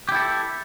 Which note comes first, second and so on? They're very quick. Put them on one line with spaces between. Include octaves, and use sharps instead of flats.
G4 E4 A4